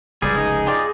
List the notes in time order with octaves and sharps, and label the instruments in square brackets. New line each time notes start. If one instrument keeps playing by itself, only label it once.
[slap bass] F1 C#2 G#2 [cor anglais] G3 [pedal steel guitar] G#4
[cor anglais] D#4
[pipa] F4 G4 D5